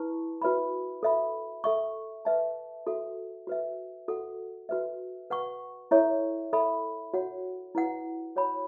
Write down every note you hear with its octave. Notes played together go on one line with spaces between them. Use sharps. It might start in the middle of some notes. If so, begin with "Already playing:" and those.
Already playing: E4 B4 A5 C#6
F#4 B4 E5 B5
A4 E5 B5
A4 E5 C#6
B4 E5 A5
F#4 A4 E5
F#4 B4 E5
F#4 A4 F#5
F#4 B4 E5
B4 F#5 C#6
E4 A4 C#5 E5 C#6
A4 E5 B5
F#4 C#5 F#5
E4 B4 F#5
F#4 C#5 F#5 B5